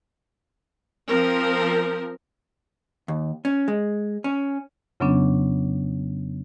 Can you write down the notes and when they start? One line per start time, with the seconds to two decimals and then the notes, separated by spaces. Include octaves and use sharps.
1.07 F3 C4 A#4
3.08 D#2
3.45 C#4
3.68 G#3
4.24 C#4
5.00 F2 C#3 F#3 B3 C#4 D4